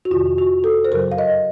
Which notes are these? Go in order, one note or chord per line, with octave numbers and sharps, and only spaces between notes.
F#4
F2 C3 D#3 F4
F#4
A4
C5
F#2 C#3 F#3 A#4
F5
D#5